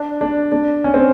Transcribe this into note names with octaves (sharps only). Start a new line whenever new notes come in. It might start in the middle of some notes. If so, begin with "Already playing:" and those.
Already playing: D4
D4
D4
C#4
C4